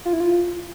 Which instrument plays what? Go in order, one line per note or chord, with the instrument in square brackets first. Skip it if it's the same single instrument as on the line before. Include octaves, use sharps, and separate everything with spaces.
[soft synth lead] F4
E4
F4